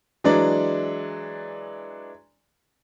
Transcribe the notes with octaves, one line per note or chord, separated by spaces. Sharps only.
E3 F#3 G#3 D4 D5